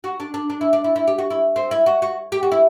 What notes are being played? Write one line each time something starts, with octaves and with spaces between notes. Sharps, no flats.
F#4
D4
D4
D4
E4
D4
E4
E4
G4
F#4
E4
C4
E4
F#4
F#4
G4
F#4
E4